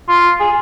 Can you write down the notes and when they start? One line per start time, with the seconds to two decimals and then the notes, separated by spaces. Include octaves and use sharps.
0.08 F4
0.40 G#4